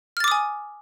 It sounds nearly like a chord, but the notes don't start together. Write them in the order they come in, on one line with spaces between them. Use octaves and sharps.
F6 A6 D6 D#6 G#5